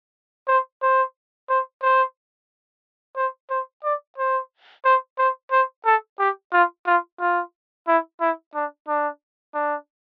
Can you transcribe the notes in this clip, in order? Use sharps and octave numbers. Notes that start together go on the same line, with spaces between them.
C5
C5
C5
C5
C5
C5
D5
C5
C5
C5
C5
A4
G4
F4
F4
F4
E4
E4
D4
D4
D4